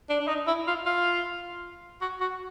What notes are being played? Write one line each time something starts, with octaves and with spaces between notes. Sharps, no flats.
D4
D4
D#4
E4
F4
F4
F#4
F#4